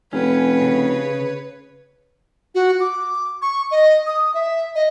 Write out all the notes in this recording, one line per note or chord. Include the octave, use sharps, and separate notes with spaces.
F1 C#4 B4 C#5
C#3
F#4
D6
C#6
D#5
D#6
E5
D#5